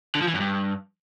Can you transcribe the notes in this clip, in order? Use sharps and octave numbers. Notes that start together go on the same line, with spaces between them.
D3
F3
E3
F#2
G2